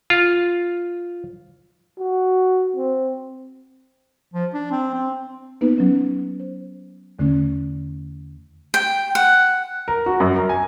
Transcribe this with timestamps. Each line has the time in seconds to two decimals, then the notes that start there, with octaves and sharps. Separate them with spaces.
0.10 F4
1.99 F#4
2.76 C4
4.34 F3
4.54 D4
4.71 C4
4.94 C4
5.61 A#3 B3 D#4 B4
5.78 F#3 C#4
6.40 C5
7.19 E2 D3 A3 C#4
8.74 G5
9.15 F#5
9.88 A#4
10.06 F#4
10.20 F#2
10.36 A#4
10.49 G#5